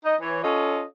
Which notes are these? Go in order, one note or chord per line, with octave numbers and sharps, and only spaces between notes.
D#4 D#5
E3 C#5
C#4 F4 A4 C#5 D#5